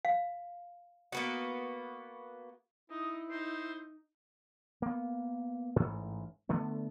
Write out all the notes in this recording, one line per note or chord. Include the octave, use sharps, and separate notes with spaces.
F5
A#3 B3 F#4
D#4 E4 D#6
D#4 C5 C7
A#3 B3
A1 G#2
D3 A3 B3